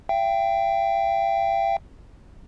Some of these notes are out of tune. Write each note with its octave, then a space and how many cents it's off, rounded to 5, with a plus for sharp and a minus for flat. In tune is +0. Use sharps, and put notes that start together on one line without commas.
E5 +45 G5 +0